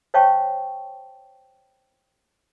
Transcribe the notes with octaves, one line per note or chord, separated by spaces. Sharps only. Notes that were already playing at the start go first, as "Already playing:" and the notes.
C5 C#5 F5 G5 A5 C#6